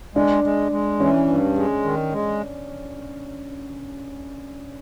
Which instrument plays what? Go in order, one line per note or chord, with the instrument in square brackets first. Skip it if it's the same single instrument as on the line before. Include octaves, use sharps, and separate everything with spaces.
[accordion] G#3 [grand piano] D4
[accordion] G#3
G#3
[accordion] E3 [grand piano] C#4
[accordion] G2
G#3
D#3
G#3